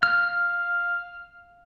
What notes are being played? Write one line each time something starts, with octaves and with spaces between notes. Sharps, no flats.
F5 F6